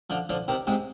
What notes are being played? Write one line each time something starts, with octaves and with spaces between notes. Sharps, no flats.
D3 F3
D3 F3
C3 D#3
G#2 C3